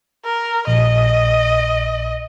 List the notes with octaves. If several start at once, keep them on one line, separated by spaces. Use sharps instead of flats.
A#4
A#1 D#5